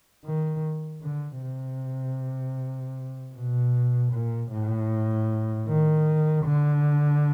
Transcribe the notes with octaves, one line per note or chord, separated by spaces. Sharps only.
D#3
D3
C3
B2
A#2
A2
D#3
D3